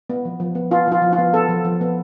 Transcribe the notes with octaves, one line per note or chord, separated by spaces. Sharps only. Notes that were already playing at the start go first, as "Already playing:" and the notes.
B3
F3
F3
B3
B3 F4
F3 F4
F3
F4
B3
B3 A4
F3
F3
B3